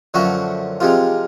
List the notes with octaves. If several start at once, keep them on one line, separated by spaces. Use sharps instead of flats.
F#2 D3 F3 A3 F#4
C3 F3 G#3 F4